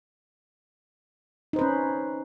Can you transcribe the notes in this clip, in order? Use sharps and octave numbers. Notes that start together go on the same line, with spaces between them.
C#4 D#4 B4 C5